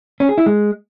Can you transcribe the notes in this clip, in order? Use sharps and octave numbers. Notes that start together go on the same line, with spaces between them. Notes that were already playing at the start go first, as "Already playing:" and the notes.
C#4
G#4
E4
G#3